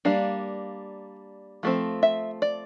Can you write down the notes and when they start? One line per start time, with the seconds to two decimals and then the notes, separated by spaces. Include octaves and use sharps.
0.05 G3 A#3 D4 F5
1.63 F3 A3 C4
2.03 E5
2.42 D5